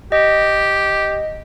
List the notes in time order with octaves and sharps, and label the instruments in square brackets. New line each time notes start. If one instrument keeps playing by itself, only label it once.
[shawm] G4 [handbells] D#5